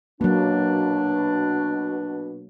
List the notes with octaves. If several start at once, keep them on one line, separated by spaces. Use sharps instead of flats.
B2 F#3 A#3 D4